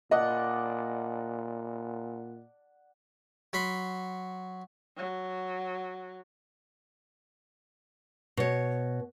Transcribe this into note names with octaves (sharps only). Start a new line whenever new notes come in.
A#2 D5 D#5 F#5 A5
F#3 F#4 B5 C6
F#3
B2 C#5